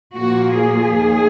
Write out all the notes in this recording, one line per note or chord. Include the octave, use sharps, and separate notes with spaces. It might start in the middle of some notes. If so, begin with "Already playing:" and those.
A#2 F3 A#3 F#4
G#4
D#2